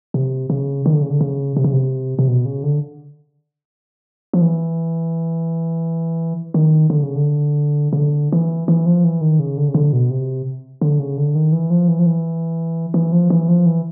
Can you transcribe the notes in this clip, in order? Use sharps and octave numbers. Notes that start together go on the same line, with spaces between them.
C3
C#3
D#3
D3
C#3
D3
C#3
C3
C#3
C3
C3
B2
C#3
D3
F3
E3
D#3
D3
C#3
D3
C#3
D3
E3
E3
F3
E3
D#3
C#3
D3
C#3
D3
B2
C3
D3
C#3
D3
D#3
E3
F3
E3
F3
E3
E3
F3
E3
F3
E3